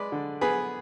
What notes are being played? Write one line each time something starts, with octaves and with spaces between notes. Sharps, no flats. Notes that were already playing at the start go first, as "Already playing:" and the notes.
Already playing: G#3 B4 D5
D3
B3 G#4 B4